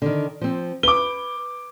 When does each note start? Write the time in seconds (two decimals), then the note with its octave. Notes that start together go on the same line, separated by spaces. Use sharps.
0.02 D3 D#3
0.41 F3 C4
0.83 B4 D6 G7